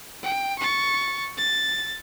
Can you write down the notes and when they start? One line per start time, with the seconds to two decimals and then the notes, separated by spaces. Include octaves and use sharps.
0.23 G5
0.59 C#6 A6
1.38 A6